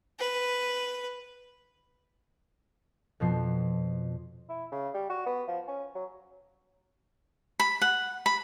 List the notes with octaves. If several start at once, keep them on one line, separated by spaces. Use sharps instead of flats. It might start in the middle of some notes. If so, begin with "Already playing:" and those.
B4
F2 B2 F3 C7
E4
C#3
G3
F#4
B3
F3
C#4
F#3
B5
F#5
B5